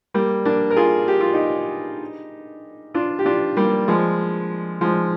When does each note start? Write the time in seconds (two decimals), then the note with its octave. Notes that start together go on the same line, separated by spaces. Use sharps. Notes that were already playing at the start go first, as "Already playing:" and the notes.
0.14 G3 A#3
0.45 A#3 D4
0.70 A#4
0.76 F4 G#4
1.08 G4
1.21 F4
1.33 D#4 G4
2.94 D4 F4
3.19 G4
3.26 D4 F4
3.56 G3 A#3
3.88 F3 G#3
4.81 F3 G#3